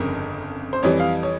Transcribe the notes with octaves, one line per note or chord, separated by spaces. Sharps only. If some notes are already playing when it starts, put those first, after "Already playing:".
Already playing: G1 F2 C#3 A#4
C5
F2 E3 G3 C#5
F5
C#5